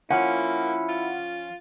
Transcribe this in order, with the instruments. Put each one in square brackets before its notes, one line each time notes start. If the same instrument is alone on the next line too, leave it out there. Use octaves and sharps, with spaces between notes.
[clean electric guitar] F3 C#4 [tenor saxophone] A#3 [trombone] E4 [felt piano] F#5
[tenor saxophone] F4